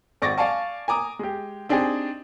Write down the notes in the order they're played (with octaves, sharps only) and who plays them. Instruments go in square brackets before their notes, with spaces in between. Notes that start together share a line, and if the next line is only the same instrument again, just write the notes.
[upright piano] G#1 D5 C#6 D6 A6 A#6
D5 F5 G#5 A5 C#6
G#5 A#5 D6 D#6
G#3 G4
C4 D4 D#4 G4 G#4